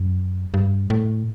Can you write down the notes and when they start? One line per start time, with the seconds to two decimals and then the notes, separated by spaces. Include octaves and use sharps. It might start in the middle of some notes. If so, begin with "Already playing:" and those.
Already playing: F#2
0.54 G2
0.90 A2